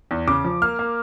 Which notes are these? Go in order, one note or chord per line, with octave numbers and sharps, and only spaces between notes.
E2
C#3 D6
F3
A#3 F6
A#3